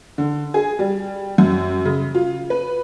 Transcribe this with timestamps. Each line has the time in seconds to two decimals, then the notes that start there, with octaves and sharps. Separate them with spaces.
0.18 D3
0.54 G#4
0.79 G3
1.38 F#2
1.85 C#3
2.15 F4
2.50 B4